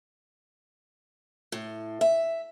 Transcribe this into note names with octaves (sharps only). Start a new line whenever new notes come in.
A2
E5